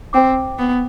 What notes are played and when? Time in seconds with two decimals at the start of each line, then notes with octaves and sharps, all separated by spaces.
0.13 C4 C5 G5 D6
0.58 B3